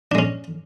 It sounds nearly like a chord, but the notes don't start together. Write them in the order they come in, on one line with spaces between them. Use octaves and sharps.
D4 G#3 C#4